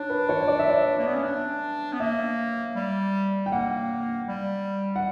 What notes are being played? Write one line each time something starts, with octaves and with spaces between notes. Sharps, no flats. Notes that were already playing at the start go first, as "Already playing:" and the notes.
Already playing: D4 C#5
B4
C#5
D5
E5
D5
A#3
B3
C#4
D4
B3
A#3 E5
G3
G5
A#3 F#5
G3
F#5